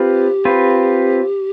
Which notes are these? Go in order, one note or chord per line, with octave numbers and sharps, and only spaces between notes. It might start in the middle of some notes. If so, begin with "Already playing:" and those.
Already playing: C4 F4 G4 B4
C4 F4 B4